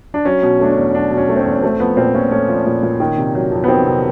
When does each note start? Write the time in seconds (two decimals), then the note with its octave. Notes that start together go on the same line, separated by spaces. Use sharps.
0.14 D4
0.25 F#3 C#4
0.42 B2
0.60 A3 D4
0.72 C#4
0.77 E2
0.95 F#3 D4
1.11 B2
1.17 C#4
1.29 A3
1.36 C4
1.40 C#4
1.46 E2
1.54 C#4
1.62 A3 C4
1.80 F3 B3
1.97 A#2 C4
2.14 A#2 C#4
2.31 A3 C#4
2.49 F3
2.66 A#2
2.83 A#2
3.00 D#3
3.18 C3
3.35 F#3
3.52 F2
3.64 B3
3.68 D#3 C4
3.87 C3